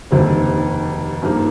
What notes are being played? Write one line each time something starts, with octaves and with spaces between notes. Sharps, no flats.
F1 D#2 D3 G3 C4
G2 F3 A#3 D#4 G4